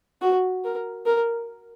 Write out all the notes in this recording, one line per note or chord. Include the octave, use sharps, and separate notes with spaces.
F#4
A#4
A#4